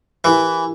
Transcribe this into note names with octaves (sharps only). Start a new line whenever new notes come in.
E3 E4 G4 A#4